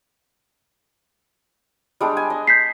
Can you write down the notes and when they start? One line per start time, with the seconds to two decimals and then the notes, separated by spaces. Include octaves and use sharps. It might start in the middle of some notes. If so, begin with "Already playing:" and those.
2.00 G3 G#3 D4
2.17 G#5
2.30 D#5
2.47 G6 B6 C7